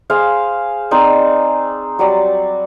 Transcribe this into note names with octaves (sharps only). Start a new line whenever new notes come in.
G#4 C5 F5
C4 D#4 C5 D5
F#3 G3 D5